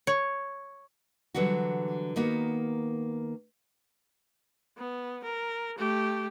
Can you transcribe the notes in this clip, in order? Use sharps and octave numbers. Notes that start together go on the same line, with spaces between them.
C#5
D3 E3 F#3 G3 F#4
D#3 A#3 B3 F#4
B3
A#4
A3 G4